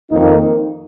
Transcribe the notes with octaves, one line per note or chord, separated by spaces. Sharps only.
F2 D#3 A#3 D#4